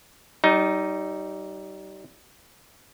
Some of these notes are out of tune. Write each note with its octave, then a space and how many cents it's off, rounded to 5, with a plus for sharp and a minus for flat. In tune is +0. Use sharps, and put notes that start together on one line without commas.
G3 -30 D#4 +5